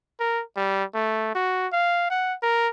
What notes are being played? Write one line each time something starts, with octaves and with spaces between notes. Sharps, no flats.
A#4
G3
A3
F#4
F5
F#5
A#4